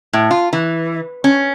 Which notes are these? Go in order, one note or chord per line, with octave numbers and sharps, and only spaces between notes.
A2
F4
E3
C#4